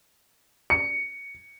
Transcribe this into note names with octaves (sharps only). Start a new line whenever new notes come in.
C#7